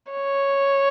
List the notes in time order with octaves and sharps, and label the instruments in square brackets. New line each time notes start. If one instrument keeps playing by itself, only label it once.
[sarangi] C#5